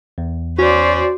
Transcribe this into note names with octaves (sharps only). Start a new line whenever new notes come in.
E2
C#4 F#4 C5 D5